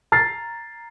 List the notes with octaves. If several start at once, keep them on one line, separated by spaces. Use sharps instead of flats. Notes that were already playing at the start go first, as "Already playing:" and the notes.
A#5 F6 A6 C7